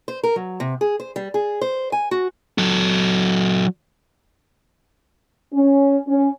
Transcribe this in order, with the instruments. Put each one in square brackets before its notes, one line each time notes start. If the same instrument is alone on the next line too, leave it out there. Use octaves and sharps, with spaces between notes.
[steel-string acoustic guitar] C5
A#4
F#3
C3
G#4
C5
G3
G#4
C5
G#5
F#4
[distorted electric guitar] F#3 A4
[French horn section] C#4
C#4